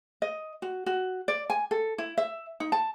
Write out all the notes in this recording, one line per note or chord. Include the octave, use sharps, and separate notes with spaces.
D#5
F#4
F#4
D5
G#5
A4
E4
E5
D#4
A5